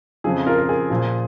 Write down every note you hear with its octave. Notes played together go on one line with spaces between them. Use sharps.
F2 C#3 F3 G#4
F4 A#4
A#4
G#4
A#2 F3